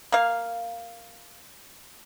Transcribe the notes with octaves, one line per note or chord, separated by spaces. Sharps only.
A#3 F5